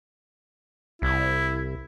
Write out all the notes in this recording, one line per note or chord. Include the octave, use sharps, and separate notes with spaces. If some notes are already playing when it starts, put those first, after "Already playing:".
C2 E4